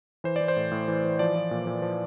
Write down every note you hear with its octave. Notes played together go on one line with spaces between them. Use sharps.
E3 C5
E3 D5
C5
A2
A2
E3
E3
F3 D5
F3
A#2
A#2
F3